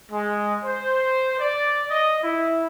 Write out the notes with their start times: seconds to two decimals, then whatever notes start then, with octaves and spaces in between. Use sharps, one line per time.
0.11 G#3
0.65 C5
1.39 D5
1.90 D#5
2.23 E4